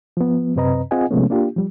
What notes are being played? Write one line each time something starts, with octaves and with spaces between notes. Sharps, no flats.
F3 B3
F#2 C3 C4 B4 D#5 A#5
C4 F4 G#4 D#5 F#5 G#5
C3 F3 G#3 A3 B3 C#4
A#3 D4 F4 G4
F3 G3